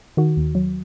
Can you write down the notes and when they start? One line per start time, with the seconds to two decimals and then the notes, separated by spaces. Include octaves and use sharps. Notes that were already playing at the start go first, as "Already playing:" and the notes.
0.17 D#3 F#4
0.37 D#2
0.55 F#3